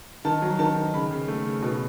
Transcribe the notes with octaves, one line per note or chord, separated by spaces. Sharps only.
D#3 A5
F#3
D#3 A5
D#3
C#3 B5
C#3
A3
C#3
B2